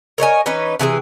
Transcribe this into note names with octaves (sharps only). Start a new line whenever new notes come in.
A#4 C#5 D#5 G#5
E3 C#4 D#4 B4
C3 E3 F#4 G#4